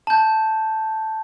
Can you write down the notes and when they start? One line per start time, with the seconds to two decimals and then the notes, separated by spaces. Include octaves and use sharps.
0.07 A5 G6